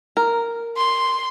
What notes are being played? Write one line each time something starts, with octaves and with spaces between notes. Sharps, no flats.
A#4
C6